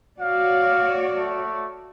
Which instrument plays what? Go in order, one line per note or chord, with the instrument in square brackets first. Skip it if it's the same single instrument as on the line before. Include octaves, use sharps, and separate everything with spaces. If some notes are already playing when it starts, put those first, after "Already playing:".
[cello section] F#4 C#5 D5 [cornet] F5
[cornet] A3